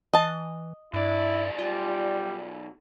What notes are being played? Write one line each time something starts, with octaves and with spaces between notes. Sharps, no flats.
E3 D#5 A5
B1 G2 E4 D5
G3 F4